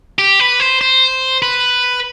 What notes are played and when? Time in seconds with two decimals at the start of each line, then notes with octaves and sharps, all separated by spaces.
0.19 G4
0.40 B4
0.60 C5
0.81 C5
1.42 B4